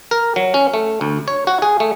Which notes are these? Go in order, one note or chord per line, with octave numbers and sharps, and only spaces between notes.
A#4
F#3
C#4
A3
D2
C#5
F#4
G#4
A3